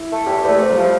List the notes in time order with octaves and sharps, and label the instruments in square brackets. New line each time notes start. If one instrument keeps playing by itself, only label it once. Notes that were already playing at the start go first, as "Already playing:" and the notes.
Already playing: [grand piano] E4
[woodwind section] A3
[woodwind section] E2 [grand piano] G4
[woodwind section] E2
[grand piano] A3
[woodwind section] C3
[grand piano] G3
[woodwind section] F3